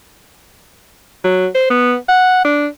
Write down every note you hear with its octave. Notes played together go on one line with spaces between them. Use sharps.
F#3
C5
B3
F#5
D4